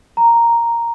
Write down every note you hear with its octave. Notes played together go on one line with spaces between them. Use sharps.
A#5